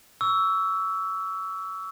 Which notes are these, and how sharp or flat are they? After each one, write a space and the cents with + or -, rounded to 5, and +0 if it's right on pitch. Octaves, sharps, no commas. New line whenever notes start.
C#6 +35 E6 +0